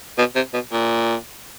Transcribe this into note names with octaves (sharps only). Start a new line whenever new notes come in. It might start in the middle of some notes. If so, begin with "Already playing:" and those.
B2
C3
B2
A#2